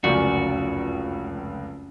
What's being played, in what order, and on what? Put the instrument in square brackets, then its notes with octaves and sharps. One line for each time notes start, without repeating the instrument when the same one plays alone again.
[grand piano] F1 C#2 [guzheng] F#2 F3 [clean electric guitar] F#4 D5